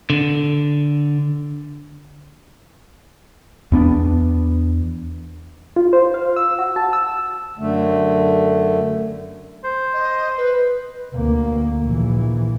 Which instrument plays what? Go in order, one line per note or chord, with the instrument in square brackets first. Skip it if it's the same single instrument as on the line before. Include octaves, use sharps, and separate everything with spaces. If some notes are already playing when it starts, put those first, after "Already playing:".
[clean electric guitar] D3
[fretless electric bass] E2 B3 D4
[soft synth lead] F4
C5
F5
E6
F#4
A5
E6
[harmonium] F#2 D3 A3
[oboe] C5
[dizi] D#5
B4
[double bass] D2 A#3
A#1 E3